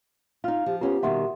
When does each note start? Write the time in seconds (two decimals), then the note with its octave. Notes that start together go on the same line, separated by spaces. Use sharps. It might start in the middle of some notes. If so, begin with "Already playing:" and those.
0.44 D#4 F4 F5 F6
0.66 F3 G4
0.81 B3 C#4 F4 G4 C5
1.03 B2 D#3 G3 E5 F#5 C6